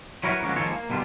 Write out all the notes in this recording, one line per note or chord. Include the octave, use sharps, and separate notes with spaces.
F#3 E4 F#4 A#4 B4 C#5
C#3 F3 G#3 A#3 C#4 F#4
D#3 F3 G#3 A#3 A4 C#5
A#3
B2 D3 G3 D4 F4